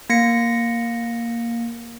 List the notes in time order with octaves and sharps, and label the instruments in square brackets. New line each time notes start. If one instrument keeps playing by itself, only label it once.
[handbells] A#3 A#6 C#7